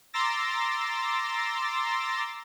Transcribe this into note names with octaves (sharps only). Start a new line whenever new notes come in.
A#5 C6 D6 E6 A6 A#6